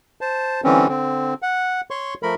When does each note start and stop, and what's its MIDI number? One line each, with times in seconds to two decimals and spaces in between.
0.21 0.61 72
0.21 0.61 81
0.64 0.88 50
0.64 0.88 52
0.64 0.88 55
0.64 0.88 60
0.64 0.88 61
0.88 1.34 50
0.88 1.34 60
1.42 1.81 78
1.91 2.14 73
1.91 2.14 84
1.91 2.14 85
2.23 2.35 53
2.23 2.35 57
2.23 2.35 70
2.23 2.35 83